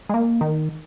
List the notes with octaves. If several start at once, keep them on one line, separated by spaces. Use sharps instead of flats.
G#3
A#3
D#3